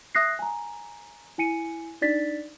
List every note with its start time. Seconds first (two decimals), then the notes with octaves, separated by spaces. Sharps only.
0.15 E5 D#6 F#6 A#6 C7
0.39 G#5 A#5
1.38 E4 G#5 C#7 D#7
2.01 D4 D#4 D5 A6 B6